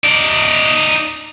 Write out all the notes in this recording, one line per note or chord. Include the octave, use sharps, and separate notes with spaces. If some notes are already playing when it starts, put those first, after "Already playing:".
D#4 D5